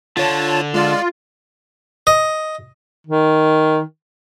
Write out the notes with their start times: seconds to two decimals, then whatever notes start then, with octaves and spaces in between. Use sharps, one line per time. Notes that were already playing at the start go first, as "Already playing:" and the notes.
0.17 D3 F4 C#5 A5
0.74 G#3 F4 D5
2.07 D#5
3.07 D#3